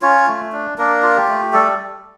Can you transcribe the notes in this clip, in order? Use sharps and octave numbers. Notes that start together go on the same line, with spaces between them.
C#4 F4 C#5
A3
D4
A#3 D4 A#4
F4
G4
A3
G3 A4